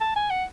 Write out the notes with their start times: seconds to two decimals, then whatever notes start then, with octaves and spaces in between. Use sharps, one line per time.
0.01 A5
0.16 G#5
0.31 F#5